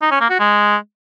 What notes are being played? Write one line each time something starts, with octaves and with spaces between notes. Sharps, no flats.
D#4
C#4
A#3
F#4
G#3